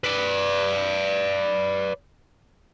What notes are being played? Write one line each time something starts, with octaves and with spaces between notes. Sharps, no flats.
B4 D5